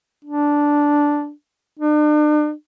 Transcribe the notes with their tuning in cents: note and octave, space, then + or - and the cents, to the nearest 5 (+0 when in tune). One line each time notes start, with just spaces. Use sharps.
D4 -5
D4 +40